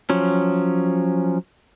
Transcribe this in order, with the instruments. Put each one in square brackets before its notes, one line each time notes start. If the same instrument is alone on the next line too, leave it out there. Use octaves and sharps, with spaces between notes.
[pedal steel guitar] F3 F#3 C#4